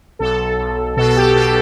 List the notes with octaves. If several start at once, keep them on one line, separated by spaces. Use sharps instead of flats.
B1 A4
B1
B2 A4
A4
G4
B2 A4